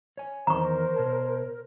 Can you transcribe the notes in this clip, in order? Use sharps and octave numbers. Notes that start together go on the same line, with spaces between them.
C#5 G#5
E2 G#2 D#3 A#4 C5 A#5 C#6
B2 C#5 A5